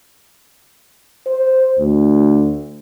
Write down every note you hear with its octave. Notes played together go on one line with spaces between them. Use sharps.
C5
D2